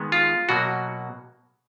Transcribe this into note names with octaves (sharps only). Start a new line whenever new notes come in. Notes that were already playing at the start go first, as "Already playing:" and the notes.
Already playing: D#3 G#3 B3
F4
B2 F#3 A#3 F#4